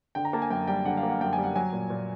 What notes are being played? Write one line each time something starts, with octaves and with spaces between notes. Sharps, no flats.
D3 G5
A#5
A#3 A5
G#5
F#2 G5
G3 G5
D3 F#5
F5
A#3
F#5
F#2 G5
G#5
G3
F#5
F#3 G#5
A#2
A#2